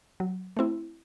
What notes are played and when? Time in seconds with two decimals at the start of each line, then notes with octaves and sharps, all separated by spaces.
0.20 F#3
0.57 A3 C4 E4